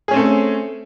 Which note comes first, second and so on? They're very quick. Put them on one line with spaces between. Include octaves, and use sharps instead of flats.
G#4 C#4 C4 A3